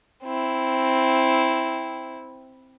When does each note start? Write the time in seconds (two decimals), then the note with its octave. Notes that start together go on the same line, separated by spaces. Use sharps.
0.24 C4 E4